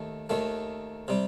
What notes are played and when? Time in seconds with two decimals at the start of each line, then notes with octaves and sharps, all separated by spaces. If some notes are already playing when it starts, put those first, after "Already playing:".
Already playing: D#2 D#3 A3
0.30 D#2 D#3 A3
1.08 C3 G3